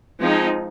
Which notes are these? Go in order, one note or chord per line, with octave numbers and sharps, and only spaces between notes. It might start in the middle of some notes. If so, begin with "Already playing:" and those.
F3 G#3 C4 D#4